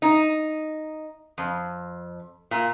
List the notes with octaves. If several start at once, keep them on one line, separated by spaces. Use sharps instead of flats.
D#4
F2
A#2